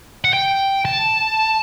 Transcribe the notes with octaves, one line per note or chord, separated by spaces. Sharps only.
F#5
G5
A5